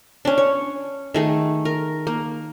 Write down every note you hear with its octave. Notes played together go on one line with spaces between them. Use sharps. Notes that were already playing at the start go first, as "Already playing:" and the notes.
C#4 D4
C#5
D#3 A3 G#4
A#4
A#3